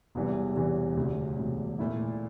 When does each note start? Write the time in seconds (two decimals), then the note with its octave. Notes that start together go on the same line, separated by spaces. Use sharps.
0.15 E1 E2 C3 E3 G3
0.56 E1 E2 C3 E3 G3
0.97 E1 D2 C3
1.37 E1 D2 C3
1.79 A#2 A3 E4